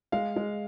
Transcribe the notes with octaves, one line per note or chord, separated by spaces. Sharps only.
G#3 F5
G#3